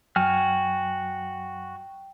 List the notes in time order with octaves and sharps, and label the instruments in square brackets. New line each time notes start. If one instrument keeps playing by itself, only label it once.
[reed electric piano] F#2 F#3 [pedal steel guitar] F#4 G#5 F6 [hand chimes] G5